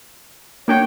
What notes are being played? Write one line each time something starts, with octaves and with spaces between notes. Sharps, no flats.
A#3 D4 F#4 C#5 G5